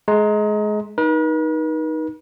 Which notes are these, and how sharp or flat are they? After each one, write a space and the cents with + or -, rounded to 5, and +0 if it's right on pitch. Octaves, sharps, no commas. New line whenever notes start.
G#3 +25 A#5 +0
D#4 +5 B4 -45